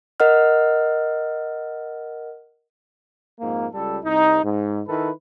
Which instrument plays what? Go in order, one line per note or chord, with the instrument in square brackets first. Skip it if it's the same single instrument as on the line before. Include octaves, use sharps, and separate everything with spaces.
[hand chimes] A#4 D#5 F#5 F6
[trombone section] F2 G#2 A#3
C#2 G3 A4
C2 D#4
G#2
D#3 E4 A4 B4